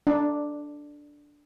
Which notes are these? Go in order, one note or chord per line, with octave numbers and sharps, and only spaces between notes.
D4